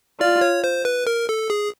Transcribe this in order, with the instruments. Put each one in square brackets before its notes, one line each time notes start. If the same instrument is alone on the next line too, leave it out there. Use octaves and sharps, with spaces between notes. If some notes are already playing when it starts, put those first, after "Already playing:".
[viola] F4 [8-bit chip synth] D5
[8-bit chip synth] C#5
C5
B4
A#4
A4
G#4